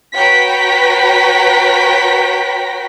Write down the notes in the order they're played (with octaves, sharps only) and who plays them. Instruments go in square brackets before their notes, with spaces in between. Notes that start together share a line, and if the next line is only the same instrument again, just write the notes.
[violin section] F#4 B4 C#5 G5 A#5 B6